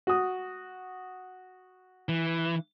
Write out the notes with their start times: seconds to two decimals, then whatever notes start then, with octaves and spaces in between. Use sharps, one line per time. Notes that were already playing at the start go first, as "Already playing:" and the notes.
0.07 F#4 D#6
2.09 E3